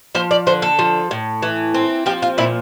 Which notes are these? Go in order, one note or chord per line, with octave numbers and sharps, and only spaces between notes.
F3 C5
D5
D3 C5
A4
F3
A2
E3
C4
F3 G4
F4
A#2 E4